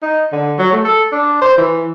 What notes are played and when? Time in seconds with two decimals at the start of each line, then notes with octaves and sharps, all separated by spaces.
0.03 D#4
0.33 D3
0.59 F#3
0.72 A3
0.85 A4
1.12 D4
1.41 C5
1.58 E3